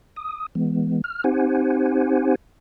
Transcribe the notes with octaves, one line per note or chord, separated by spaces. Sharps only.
D#6
E3 G#3 B3
F6
C4 D#4 G4 C5 F#5 G#5